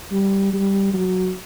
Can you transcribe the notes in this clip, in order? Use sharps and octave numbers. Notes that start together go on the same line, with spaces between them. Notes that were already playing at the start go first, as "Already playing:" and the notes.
G3
G3
F#3